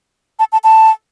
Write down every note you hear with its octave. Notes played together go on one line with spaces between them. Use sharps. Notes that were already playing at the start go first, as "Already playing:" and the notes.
A5
A5
A5